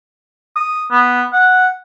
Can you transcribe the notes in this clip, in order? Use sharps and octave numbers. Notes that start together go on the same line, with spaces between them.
D#6
B3
F#5